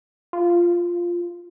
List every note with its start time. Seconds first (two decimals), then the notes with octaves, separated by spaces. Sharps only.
0.33 F4